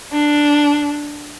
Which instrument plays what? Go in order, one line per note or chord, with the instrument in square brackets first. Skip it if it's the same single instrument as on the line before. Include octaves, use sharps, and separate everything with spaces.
[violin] D4